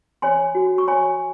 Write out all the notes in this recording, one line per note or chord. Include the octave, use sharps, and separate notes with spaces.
C#5 G#5 C6
F#4
C#6
C#5 G#5 C6